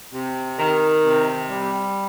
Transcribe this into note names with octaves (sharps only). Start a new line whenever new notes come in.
C3
D#3
C3
G3